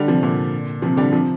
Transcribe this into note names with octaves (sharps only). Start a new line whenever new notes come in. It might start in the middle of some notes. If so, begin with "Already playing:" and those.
Already playing: D3 G3
C3 F3
A#2 D3
C3 F3
D3 G3
C3 F3